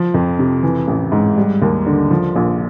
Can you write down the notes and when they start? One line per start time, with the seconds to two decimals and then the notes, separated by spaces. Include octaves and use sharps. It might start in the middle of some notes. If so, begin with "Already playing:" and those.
Already playing: F3
0.14 F2
0.39 C3
0.63 E3
0.88 A1
1.12 G#2
1.37 G3
1.62 D#2
1.87 D3
2.10 F3
2.36 A#1